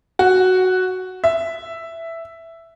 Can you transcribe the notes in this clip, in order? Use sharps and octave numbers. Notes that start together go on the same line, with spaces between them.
F#4
E5